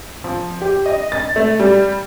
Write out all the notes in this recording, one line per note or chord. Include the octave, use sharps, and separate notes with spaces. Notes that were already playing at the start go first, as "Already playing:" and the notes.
F3
G4
D#5
A6
A3
G3